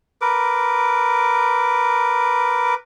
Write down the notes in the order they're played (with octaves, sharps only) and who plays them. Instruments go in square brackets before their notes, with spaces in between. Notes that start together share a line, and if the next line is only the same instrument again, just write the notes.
[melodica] A#4 B4 D6